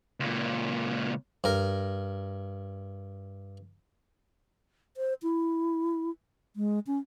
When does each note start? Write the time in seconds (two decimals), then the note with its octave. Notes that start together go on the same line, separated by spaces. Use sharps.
0.20 C#2 A#2
1.44 G2 A#4
4.97 C5
5.23 E4
6.56 G#3
6.87 C#4